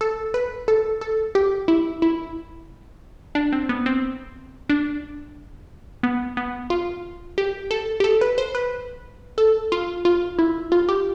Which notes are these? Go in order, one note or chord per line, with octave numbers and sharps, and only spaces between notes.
A4
B4
A4
A4
G4
E4
E4
D4
C4
B3
C4
D4
B3
B3
F4
G4
A4
G4
A4
B4
C5
B4
A4
F4
F4
E4
F4
G4